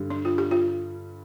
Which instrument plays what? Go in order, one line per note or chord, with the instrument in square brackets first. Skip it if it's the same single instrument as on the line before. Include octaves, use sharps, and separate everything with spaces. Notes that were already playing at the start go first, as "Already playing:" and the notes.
Already playing: [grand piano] G2 D3 G3
[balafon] D4
F4
G4
F4